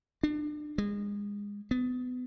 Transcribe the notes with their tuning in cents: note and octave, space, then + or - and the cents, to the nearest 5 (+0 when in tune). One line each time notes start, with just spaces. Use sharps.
D4 +30
G#3 -25
B3 +25